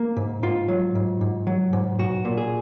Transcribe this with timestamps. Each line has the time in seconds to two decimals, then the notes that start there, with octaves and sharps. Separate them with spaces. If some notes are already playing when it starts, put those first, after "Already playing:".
Already playing: A#3
0.17 G#2
0.43 G#2 F4
0.68 F#3
0.95 G#2
1.21 G#2
1.47 F#3
1.73 G#2
1.99 B1 F#4
2.25 A#2
2.37 G#4